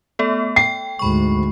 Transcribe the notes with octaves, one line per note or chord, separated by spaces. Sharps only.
A3 B3 A4
G5 C7
D2 G#2 B5 C#6